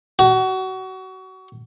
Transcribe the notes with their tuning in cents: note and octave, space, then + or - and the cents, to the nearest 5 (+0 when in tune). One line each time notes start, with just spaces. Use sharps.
F#4 +25